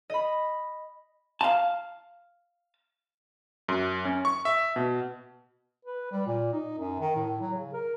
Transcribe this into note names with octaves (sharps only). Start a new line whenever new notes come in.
D#5 B5
F5 A5
F#2
C#4
C#6
E5
B2
B4
G3
A#2
D#4
F#2
D#3
A2
F#3
C#3
A#4